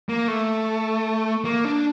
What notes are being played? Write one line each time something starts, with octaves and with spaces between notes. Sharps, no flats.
A#3
A3
A#3
D4